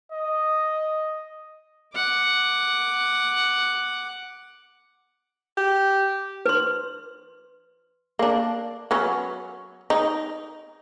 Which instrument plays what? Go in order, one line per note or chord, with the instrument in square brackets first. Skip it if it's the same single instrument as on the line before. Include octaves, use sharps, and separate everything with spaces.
[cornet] D#5
[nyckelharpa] F#5 D6
[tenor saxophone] G4
[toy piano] B4 C6
[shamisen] A#3 D4
F#3 B3 C#4
D#4